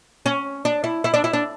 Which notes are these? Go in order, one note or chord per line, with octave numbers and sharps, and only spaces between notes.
C#4
D4
E4
E4
D4
E4
D4